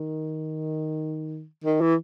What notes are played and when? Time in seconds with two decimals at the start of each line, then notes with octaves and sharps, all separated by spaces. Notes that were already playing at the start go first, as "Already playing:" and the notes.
Already playing: D#3
1.64 D#3
1.81 E3